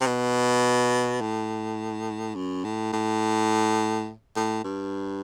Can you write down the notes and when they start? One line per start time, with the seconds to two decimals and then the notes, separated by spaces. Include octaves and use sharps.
0.01 C3
0.07 B2
1.21 A2
2.35 F#2
2.64 A2
2.93 A2
4.36 A2
4.64 G2